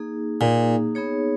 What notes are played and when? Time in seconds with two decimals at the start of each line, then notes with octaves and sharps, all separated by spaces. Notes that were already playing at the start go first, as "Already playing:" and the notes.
Already playing: A#3 D#4 G#4
0.41 A#2 A#3 D#4 G#4
0.95 B3 D#4 G#4 C#5